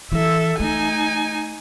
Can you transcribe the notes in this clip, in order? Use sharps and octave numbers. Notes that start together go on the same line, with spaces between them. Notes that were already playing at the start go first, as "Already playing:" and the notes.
E3 E4 A4 E5
A3 D#4 G#5